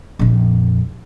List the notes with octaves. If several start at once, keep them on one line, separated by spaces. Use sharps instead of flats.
A#1 F2